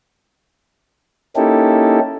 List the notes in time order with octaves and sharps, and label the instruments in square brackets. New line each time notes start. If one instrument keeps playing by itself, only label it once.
[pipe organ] A#3 C#4 D#4 E4 G4 A4